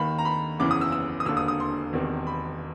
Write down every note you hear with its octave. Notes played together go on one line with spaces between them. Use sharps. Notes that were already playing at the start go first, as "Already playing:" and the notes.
Already playing: D#2 D#3 B5
A#5
B5
F#1 E2 C#3 E3 D6
D#6
E6
E6
D#6
E1 D#2 D3 E6
D#6
D#6
C6
E1 E2 C3 D#3
B5